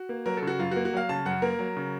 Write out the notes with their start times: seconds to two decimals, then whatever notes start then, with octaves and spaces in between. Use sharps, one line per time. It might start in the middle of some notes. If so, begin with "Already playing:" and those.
Already playing: F#4
0.09 A#3
0.26 F#3 A#4
0.37 A4
0.42 C#3 F#4
0.59 F#2 F4
0.71 F#4
0.76 A#3
0.85 F#4
0.93 F#3 F5
1.09 C#3 A5
1.25 F#2 F#5
1.42 A#3 A#4
1.59 F#3
1.77 C#3